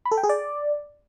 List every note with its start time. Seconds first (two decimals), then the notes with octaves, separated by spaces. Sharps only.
0.05 B5
0.11 A4
0.17 G5
0.23 G#4
0.29 D5